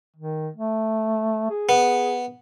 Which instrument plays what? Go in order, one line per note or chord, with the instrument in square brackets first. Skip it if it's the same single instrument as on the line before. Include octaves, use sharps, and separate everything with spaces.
[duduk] D#3
A3
G#4
[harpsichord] B3